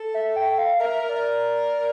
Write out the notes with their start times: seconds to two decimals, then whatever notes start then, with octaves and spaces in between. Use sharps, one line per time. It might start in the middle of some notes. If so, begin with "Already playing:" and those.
Already playing: A4
0.14 E5
0.36 G5
0.58 F5
0.80 A#4 E5
0.94 E5
1.09 D5